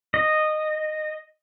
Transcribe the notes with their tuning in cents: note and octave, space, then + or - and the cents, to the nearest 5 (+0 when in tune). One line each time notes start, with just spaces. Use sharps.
D#5 -10